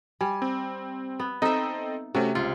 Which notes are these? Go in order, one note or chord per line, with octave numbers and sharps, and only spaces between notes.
G3 G#5
C4
B3
C4 D#4 A4 D#5 E5
C3 A3 C#4 F#4
C#2 F4